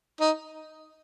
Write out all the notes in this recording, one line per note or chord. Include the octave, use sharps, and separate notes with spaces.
D#4